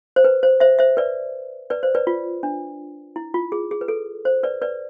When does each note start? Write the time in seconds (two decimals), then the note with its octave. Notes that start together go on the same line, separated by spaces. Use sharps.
0.16 C5
0.24 B4
0.43 C5
0.60 C5 E5
0.79 C5 E5
0.97 B4 D5
1.70 B4 D5
1.83 C5
1.95 B4 D5
2.07 F4
2.43 D4
3.16 E4
3.34 F4
3.52 G#4
3.71 G#4
3.81 B4
3.88 A4
4.25 C5
4.43 B4 D5
4.62 B4 D5